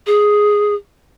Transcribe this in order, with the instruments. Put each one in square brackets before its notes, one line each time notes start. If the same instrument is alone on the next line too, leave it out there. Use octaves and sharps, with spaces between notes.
[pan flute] G#4